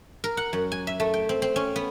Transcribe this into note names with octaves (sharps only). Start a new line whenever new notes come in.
A#4
F#5
F#2
G#5
E5
A3
G5
C4
C4
C#4
B3